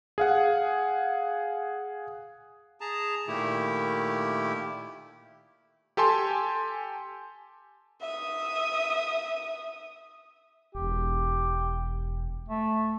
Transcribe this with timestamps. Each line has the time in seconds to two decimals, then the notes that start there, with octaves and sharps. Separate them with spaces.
0.18 G#4 F5 F#5
2.81 G#4 A5 A#5
3.28 A#2 D#3 A3 E4 G4
5.97 G4 A4 G#5 C6
8.01 E5 D#6
10.75 E1 G4
12.49 A3